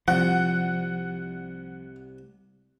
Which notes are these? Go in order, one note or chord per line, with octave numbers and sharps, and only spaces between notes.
C2 F3 F#5 G5